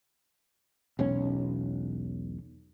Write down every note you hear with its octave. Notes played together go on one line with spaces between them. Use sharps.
E1 B1 C#4